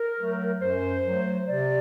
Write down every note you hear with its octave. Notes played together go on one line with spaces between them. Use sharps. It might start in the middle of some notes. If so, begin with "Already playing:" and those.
Already playing: A#4
F#3 A3
F#2 C5
F#3 A3
C3 D5